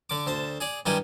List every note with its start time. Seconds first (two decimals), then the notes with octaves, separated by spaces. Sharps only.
0.10 D3 D6
0.27 D2 C5 A5
0.60 G#4 D5
0.86 G2 D#3 E4 G4 G#5